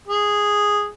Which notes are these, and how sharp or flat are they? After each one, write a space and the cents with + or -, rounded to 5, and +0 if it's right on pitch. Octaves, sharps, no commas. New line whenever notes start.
G#4 -5